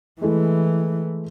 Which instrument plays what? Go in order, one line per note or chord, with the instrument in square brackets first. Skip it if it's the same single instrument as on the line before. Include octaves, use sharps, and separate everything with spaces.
[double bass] E3 [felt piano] G#3 A3 E4